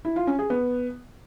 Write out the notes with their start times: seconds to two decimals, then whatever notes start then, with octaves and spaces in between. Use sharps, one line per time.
0.05 E4
0.16 F4
0.27 C#4
0.39 G#4
0.50 B3